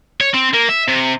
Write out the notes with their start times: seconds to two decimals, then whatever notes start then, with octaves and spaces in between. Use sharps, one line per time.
0.21 C#5
0.34 C4
0.54 A#3
0.69 E5
0.88 C3